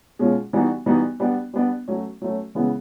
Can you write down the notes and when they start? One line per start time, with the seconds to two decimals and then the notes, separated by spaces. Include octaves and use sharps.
0.19 B2 G#3 C#4 F4
0.53 E3 G3 B3 D#4 F#4
0.86 E3 G3 B3 D#4 F#4
1.20 G3 B3 D4
1.54 G3 B3 D4
1.88 F#3 A3 C#4
2.22 F#3 A3 C#4
2.55 C#3 E3 G#3 B3 E4